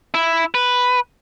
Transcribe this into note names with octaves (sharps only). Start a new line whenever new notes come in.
E4
B4